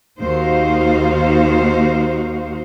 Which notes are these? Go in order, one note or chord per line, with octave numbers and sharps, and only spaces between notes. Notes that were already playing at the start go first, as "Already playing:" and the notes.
D#2 A#3 D#4 F#4 C5 F5